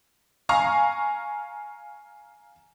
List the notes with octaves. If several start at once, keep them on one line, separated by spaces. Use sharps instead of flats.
F5 G#5 A#5 C#6